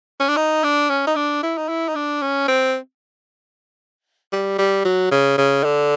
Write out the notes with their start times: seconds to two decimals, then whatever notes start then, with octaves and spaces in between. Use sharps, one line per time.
0.20 C#4
0.29 D4
0.37 D#4
0.64 D4
0.90 C#4
1.07 D#4
1.16 D4
1.43 E4
1.57 D#4
1.69 E4
1.89 D#4
1.96 D4
2.22 C#4
2.48 C4
4.32 G3
4.59 G3
4.85 F#3
5.11 C#3
5.38 C#3
5.64 D3